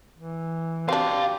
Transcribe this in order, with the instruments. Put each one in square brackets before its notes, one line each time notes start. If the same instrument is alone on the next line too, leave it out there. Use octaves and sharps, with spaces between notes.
[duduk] E3
[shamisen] C4 D4 [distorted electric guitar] F#4 F5 [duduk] G4